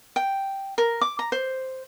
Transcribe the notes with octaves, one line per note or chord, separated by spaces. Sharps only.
G5
A#4
D6
A#5
C5